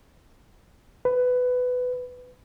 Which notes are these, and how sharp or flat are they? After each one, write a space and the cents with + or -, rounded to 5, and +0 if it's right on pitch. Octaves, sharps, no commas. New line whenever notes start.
B4 +15